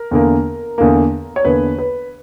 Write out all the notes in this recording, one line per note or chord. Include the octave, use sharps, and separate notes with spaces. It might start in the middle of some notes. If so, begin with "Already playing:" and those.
Already playing: A#4
E2 D3 A#3
E2 D3 A#3
C#5
E2 D3 A#3 B4
B4